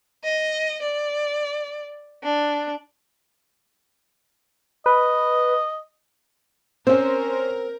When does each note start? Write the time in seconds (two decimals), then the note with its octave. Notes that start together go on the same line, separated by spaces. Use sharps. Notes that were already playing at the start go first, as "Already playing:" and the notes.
0.24 D#5
0.83 D5
2.24 D4
4.86 B4 D#5
6.87 C4 C#4 A#4 C5